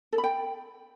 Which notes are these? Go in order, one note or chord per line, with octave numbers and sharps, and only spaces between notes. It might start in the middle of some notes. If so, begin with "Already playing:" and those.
A4
B5
G5